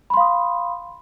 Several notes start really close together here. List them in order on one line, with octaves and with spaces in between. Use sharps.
B5 C6 F5 D#6